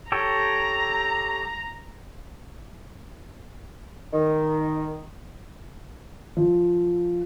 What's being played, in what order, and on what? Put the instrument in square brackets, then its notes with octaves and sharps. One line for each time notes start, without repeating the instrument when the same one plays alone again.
[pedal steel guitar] G4 A4 C#5 [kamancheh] A#5
[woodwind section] D#3
[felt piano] F3